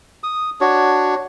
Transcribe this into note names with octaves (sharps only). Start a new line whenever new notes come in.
D#6
D4 F#4 C#5